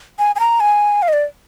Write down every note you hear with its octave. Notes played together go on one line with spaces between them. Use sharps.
G#5
G#5
A#5
G#5
F5
D#5
D5